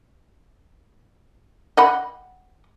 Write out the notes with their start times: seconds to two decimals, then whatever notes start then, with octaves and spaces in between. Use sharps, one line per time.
1.77 D#5 F#5 B5